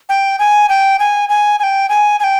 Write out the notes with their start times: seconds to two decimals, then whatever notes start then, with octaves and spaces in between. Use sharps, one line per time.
0.09 G5
0.39 G#5
0.69 G5
0.99 G#5
1.29 G#5
1.59 G#5
1.63 G5
1.89 G#5
2.20 G#5
2.24 G5